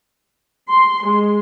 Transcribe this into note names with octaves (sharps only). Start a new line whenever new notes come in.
C6
G#3